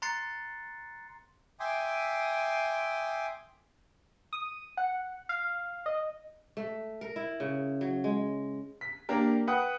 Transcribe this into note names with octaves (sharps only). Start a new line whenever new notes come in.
A#5 C6 F#6 A6 C7 C#7
E5 G5 G#5 C6 D6 D#6
D#6
F#5
F5
D#5
A3
A#4
E4
C#3
F#3
G#3
B6
A#3 D4 G4 A#4
B4 F#5 G5 D#6 F#6